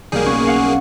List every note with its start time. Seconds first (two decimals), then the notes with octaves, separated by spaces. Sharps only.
0.12 B1 G3 A#3 G#4
0.26 B3 C#4 C#6
0.47 F5 F#5 C#6